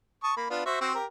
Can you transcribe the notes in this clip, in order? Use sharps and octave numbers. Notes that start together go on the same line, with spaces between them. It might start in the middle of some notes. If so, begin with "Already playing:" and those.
A5 C#6 D#6
A#3 B5
B3 D4 F4
F#4 C5 E5
C4 F#4 C5
G4 A#4